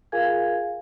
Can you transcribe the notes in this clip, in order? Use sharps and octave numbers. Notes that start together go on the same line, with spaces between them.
F4 G#4 A#4 F5 G#5 G#6